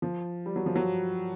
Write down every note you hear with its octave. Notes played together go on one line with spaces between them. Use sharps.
F3
G3
F#3
F3
F#3